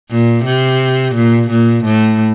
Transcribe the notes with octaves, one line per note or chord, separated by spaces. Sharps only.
A#2
C3
A#2
A#2
A2